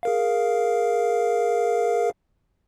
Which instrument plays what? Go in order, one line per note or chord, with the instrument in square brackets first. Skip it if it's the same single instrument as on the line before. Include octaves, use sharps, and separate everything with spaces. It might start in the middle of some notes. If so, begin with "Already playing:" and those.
[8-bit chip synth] G#4 A#4 F5